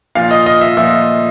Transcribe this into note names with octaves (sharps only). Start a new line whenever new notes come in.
A#2 F3 F5
D#5
D#5
E5
A#2 F3 E5